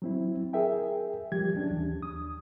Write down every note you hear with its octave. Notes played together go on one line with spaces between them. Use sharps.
F#3 C4 E4
G#4 A#4 E5 G5
F3 G3 G4 G#6
E3 F#3 C#4 D4
D#2
D#6